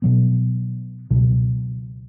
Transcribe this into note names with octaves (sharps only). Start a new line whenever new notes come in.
B2 F#3 B3
C#2 B2 F#3